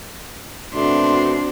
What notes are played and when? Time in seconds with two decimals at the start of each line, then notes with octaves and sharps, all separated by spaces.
0.75 B2 A3 C4 D4 F#4 C6